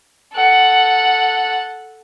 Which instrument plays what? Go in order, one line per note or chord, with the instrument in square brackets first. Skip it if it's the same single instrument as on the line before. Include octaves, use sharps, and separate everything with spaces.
[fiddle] A4 F#5